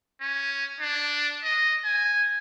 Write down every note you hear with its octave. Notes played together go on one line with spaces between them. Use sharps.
C#4
D4
D#5
G#5